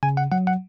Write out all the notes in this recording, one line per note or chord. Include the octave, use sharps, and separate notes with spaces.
C#3 G#5
F#5
F#3 F#5
F#5